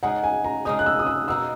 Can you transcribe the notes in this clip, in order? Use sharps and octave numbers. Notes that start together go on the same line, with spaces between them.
C#3 G#3 D#4 F#5
G#5
A#5
C#3 G#3 D#4 D#6
F#6
E6
D#6
E6
B2 A#3 D#4 E6